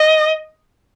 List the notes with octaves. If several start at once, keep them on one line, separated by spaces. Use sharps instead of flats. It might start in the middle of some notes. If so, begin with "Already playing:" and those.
Already playing: D#5